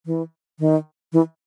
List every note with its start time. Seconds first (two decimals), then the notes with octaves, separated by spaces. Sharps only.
0.06 E3
0.59 D#3
1.13 E3